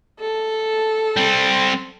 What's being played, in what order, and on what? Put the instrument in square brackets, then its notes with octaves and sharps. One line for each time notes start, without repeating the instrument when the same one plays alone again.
[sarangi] A4
[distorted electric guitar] G3 C4